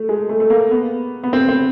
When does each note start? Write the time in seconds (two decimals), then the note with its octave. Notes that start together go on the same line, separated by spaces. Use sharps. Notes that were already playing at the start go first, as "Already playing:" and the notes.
Already playing: A3
0.09 G#3
0.29 A3
0.40 A3
0.50 A#3
0.71 B3
1.23 B3
1.33 C4
1.49 C4